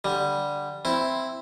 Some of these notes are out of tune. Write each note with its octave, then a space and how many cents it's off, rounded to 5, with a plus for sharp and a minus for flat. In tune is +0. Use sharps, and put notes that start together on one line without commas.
D3 +0 G3 +0
C4 +0 E4 +0